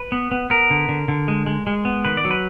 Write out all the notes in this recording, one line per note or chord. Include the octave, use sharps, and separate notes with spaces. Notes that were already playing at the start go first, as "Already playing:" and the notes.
Already playing: B4
B3
B3
B3 A#4
D3
D3
D3
G#3
G#3
G#3
B3
D#3 B4
D5
F#3
B4